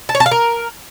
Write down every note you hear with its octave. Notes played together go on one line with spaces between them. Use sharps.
A5
C#5
A5
F5
A#4